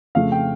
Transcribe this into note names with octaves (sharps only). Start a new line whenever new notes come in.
F2 C#3 F3 A3 F5
G5